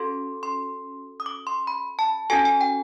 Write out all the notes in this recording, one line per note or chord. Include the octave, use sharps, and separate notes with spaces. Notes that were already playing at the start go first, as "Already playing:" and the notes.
Already playing: C#4 F#4 A4 C6
C6
D#6
D6
C6
B5
A5
C#4 F#4 A4 G#5
G#5
G5